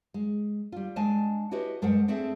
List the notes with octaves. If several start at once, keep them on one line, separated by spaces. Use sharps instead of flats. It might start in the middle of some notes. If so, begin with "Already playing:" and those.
G#3
G3 F4
G#3 D4 D#5 G#5 A5
E4 F#4 G4 B4 C#5 D#5
G2 G#3 A#4 C5 F#5
A3 C4 D4 G#4 A4 E5